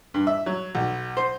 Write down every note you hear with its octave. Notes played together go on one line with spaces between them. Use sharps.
G2
E5
F#3
B1
C5